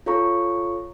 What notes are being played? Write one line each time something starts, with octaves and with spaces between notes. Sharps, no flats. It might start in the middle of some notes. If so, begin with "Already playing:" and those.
F4 A4 C#5 A#5 C#6